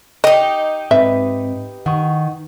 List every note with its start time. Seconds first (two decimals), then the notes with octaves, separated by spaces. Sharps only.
0.24 D#4 G4 D#5
0.91 G#2 C4 B4 E5
1.86 D#3 F#5 C#6